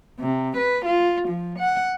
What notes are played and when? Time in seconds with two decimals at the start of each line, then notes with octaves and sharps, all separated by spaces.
0.20 C3
0.58 B4
0.86 F4
1.29 F3
1.59 F#5